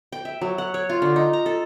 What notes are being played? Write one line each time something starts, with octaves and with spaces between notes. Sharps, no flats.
G5
E5
F#3
F#5
C#5
F4
D3
D#4
A#5
A4